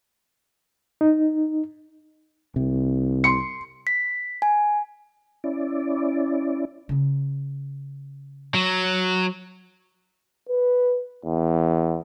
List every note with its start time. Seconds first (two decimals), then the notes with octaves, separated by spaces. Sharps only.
1.01 D#4
2.56 C2 C3
3.24 C6 C#7
3.87 B6
4.42 G#5
5.44 C#4 E4 D5
6.89 C#3 C#4
8.54 F#3
10.49 B4
11.25 E2